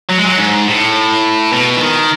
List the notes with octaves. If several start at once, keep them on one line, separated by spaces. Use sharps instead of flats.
F#3
G#3
F#3
G#2
A2
B2
E3
D#3